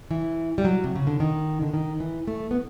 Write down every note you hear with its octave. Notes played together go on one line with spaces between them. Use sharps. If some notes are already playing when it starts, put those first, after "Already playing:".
E3
G3
F#3
C3
C#3
D3
D#3
D3
D#3
E3
A3
B3